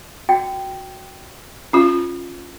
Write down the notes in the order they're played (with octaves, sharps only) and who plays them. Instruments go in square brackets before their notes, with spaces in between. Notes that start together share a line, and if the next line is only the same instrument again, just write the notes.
[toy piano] F#4 G5
[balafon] C#4 F4